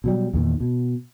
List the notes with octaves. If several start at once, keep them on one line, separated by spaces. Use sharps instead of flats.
B2 F#3 G3
E2 A#2 D#3
B2